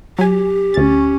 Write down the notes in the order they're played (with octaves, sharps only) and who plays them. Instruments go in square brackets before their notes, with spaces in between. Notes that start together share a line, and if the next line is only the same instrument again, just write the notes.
[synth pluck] F#3 G#5 [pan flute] G4
[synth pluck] D2 A6 [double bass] C#4